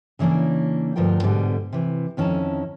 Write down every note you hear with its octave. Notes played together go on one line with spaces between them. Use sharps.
C#3 E3 A#3 C#4 D4
D2 G2 F3 F4 A#4 G5
G#2 B2 D3 G3
C3 E3
F2 D#3 C#4 E4 A5 A#5